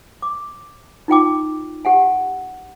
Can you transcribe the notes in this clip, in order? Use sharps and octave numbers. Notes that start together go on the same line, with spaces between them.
D6
D#4 F4 G5 D6
G4 F#5 G#5